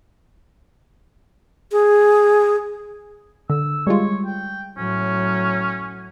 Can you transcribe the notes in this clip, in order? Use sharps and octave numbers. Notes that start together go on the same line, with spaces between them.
G#4
D3 E6
G3 G#3 F4 C#5
G5
A2 F#3 C#4